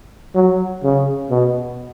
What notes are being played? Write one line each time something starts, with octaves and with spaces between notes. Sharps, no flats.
F#3
C#3
B2